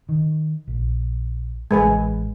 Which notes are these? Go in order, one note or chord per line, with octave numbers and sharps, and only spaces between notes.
D#3
A#1
A1 G#3 B4 G#5